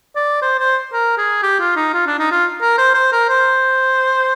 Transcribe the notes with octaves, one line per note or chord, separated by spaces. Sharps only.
D5
C5
C5
A#4
G#4
G4
F4
D#4
F4
D4
D#4
F4
A#4
C5
C5
A#4
C5